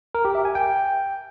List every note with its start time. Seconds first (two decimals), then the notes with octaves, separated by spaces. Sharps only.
0.15 A#4
0.25 G4
0.35 E5
0.45 G#5
0.55 G5